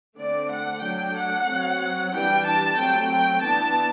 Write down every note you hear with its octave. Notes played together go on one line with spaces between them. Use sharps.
D3 A3 C4 D5
F#5
F#3 A3 D4 G5
F#5
F#3 C4
E3 G3 D4 G5
A5
F#3 A3 C4 G5
G5
E3 B3 D4 A5